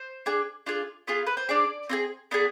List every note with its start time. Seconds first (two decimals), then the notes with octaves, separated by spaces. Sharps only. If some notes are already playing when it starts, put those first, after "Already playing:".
Already playing: C5
0.26 D4 G#4
0.66 D4 F4 G#4
1.07 B3 F4 G#4
1.27 B4
1.37 C5
1.49 D4 G#4 D5
1.89 C4 F4 G#4
2.31 B3 D4 G#4